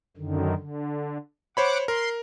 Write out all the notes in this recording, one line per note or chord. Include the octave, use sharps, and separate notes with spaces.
F#2 D3 D#3
D3
C5 C#5 F#5 B5 D6
A#4 C6